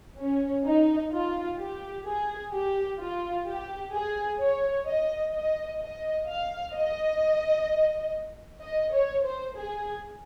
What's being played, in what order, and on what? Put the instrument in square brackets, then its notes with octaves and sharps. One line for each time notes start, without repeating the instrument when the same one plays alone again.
[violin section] C#4
D#4
F4
G4
G#4
G4
F4
G4
G#4
C#5
D#5
D#5
D#5
F5
D#5
D#5
C#5
C5
G#4